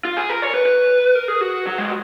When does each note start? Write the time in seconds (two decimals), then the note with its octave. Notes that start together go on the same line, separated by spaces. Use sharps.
0.05 F4
0.17 G#4
0.30 A#4
0.42 C#5
0.54 B4
0.66 B4
1.15 A#4
1.28 G#4
1.41 F#4
1.67 F#3
1.78 G#3